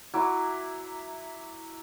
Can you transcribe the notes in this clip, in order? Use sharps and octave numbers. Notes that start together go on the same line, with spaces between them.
F#3 E4 D6